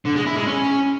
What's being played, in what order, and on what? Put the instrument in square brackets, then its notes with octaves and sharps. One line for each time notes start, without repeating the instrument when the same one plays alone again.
[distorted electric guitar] D3
G#3
E4
G#3
C#4